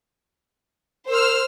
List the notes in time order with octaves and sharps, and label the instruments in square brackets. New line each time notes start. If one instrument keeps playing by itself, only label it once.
[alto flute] A#4 [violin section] C5 E6 F6